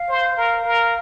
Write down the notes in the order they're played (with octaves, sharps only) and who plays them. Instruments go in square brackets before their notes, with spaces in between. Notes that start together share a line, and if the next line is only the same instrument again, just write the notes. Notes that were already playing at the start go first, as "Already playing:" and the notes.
Already playing: [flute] F5
[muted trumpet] C5
A#4
A#4